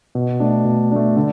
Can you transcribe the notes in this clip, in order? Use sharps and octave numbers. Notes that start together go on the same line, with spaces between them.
B2
A3 D4
B2
A3 D4
D3